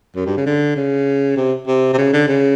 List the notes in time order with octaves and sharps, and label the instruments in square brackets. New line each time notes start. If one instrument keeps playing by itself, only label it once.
[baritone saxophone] F#2
G2
C#3
D3
C#3
C3
C3
C3
C#3
D3
C#3